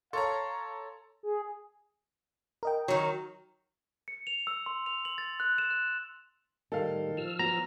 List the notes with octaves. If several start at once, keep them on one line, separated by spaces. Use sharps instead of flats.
A4 C#5 F5 A#5 C6 C#6 A6
G#4
A#4 D#5 G5
D#3 F#3
C#7
F7
E6
C6
F7
F#7
A6
F#6
E7
F#6
A2 D#3 G3 A4 F5
F3 E6 F6
F#3 B3 A#5